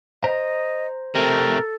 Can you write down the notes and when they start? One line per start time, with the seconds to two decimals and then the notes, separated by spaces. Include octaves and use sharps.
0.24 C5 D#5 A#5
1.15 C3 A3 A4 A#4